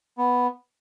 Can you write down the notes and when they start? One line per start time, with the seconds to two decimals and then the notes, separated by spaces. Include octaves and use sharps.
0.18 B3